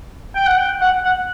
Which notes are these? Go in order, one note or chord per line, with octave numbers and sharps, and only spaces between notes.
G5
F#5
G5
F#5
F#5